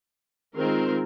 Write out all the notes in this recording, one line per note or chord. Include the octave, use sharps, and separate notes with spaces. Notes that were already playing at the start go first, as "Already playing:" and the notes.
D#3 G#3 C4 F4 A#4